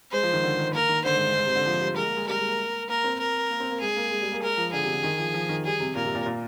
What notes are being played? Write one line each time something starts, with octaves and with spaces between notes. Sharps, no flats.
G#3 C5
F3
D#3
D3
D#3
A#3 A#4
D#3
D3 C5
G#2
G#2
G#2
C3
D3
F3
G3
G#3 A#4
A#3
G#3
G3 A#4
G#3
A#3
A#3 A#4
C4
A#4
A#3
C4
A#3
G#3 G#4
A#3
G#3
G3
A#3
G#3 A#4
F3
D3 G#4
C3
D3
D#3
F3
F3
D#3
G3 G#4
C3
A#2 A#4
C3
A#2
A#2